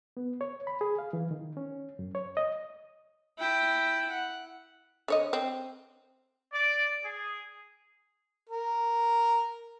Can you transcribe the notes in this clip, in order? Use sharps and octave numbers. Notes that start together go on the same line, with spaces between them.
B3
C#5
B5
G#4
F5
E3
D#3
C#4
F#2
C#5
D#5
E4 G5
F#5
D3 C#5 D#5
C4
D5
G#4
A#4